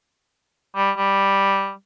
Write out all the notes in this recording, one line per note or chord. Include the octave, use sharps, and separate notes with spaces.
G3
G3